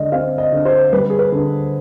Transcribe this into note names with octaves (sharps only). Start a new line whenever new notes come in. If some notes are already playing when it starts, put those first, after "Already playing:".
Already playing: D3 G#3 D5 D#5
C4 F5
D#5
D3
C5
G3 B4
G#4
B4
D3